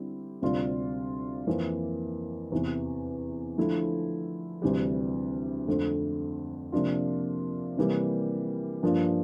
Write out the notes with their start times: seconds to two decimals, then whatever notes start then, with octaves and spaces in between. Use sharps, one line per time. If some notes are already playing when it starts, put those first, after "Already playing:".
Already playing: D3 G3 C4 E4
0.42 D2 C3 G3 D4 F4
1.47 F2 E3 A#3
2.52 E2 C3 E3
3.57 D3 F3 A3 E4
4.62 D2 C3 E3 G3
5.68 F2 D3 A3 C4
6.72 C3 F3 A#3 D4 F4
7.77 C3 E3 G3 A#3
8.83 G2 F3 A#3 D4 F4